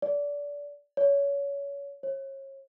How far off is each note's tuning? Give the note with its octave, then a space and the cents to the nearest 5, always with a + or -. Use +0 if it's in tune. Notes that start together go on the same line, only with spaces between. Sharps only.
D5 -25
C#5 +25
C#5 -35